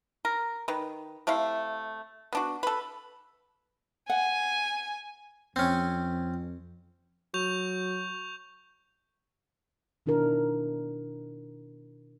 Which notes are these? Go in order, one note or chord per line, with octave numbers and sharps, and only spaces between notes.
A#4
D#3 B4
C3 A3 E4 F5
B3 D4 F#4
A4 B4
F#5 G#5
F2 C4 C#4
F#3 C#6 G6 F7
B2 D#3 D4 E4 A#4